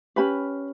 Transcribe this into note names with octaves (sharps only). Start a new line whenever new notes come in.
C#4 G4 B4 B5